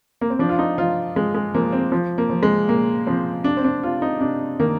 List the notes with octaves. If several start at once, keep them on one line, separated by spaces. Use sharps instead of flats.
A#3
C4
F3 D4
F4
D#4
F3 F4
F3 G#3
G#3
F3 A#3
C4
F3
A#3
F3
G#3
A#2 A#3
F3 C4
C3 D4
C4
D4
C3 F4
D#4
C3 D4
D#3 A#3